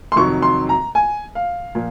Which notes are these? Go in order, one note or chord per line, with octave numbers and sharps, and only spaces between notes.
C6
F2 C3 D#3 F#3 C#6
C6
A#5
G#5
F5
A#2 F3